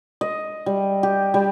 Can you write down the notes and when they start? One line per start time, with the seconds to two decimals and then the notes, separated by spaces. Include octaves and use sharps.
0.21 D#5
0.66 G3
1.03 G4
1.34 G3